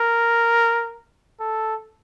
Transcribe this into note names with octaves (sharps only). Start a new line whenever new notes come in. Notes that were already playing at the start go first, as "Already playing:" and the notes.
Already playing: A#4
A4